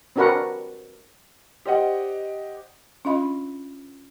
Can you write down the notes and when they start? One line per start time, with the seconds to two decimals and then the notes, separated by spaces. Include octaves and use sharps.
0.16 C4 D4 F#4 A#4 B4 F#5
1.66 G4 C5 D5 D#5 F#5
3.05 C#4 D4 F4 D#5 F5 B5